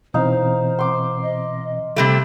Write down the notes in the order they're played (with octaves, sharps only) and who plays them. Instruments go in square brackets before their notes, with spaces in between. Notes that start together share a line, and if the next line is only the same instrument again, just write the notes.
[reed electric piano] B2 E3 C4 [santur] D#4 F5 [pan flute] C5
[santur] C6 D6
[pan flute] D#5
[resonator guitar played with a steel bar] C3 G3 A3 [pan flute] B5